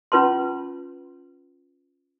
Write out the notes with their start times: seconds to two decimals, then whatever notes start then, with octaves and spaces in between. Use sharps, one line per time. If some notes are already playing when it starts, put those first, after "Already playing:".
0.12 C#4 F4 B4 A5 C6